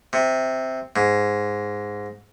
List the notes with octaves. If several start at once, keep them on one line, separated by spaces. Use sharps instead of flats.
C3
G#2